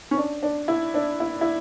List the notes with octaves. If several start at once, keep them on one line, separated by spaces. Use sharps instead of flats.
C#4
D4
D4
E4
D4
E4
E4